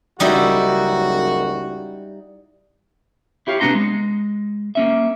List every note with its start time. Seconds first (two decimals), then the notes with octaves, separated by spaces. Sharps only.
0.20 F#1 C#2 G3 D#4 E4 F#4
3.47 E4 G4 C#5 F5
3.60 C3 A3 B3 D4 A#5 C6
3.75 G#3
4.75 A#3 C#4 E5